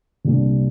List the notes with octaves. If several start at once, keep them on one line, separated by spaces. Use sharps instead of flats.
C2 A#2 G3 D4